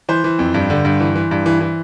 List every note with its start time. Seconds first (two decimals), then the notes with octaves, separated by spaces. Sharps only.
0.09 E3 C5
0.24 E3
0.39 F2
0.54 G2
0.70 D3
0.85 G2
1.00 E3
1.15 E3
1.31 G2
1.46 E3
1.61 E3